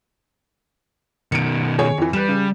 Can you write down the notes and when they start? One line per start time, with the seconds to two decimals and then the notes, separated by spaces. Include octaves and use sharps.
1.32 B2 D#3 C#7 D7
1.79 G#4 C#5
1.98 F2 E3
2.13 G3 B4 E7
2.29 C#3